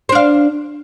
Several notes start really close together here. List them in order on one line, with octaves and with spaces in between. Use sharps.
C5 D4 F5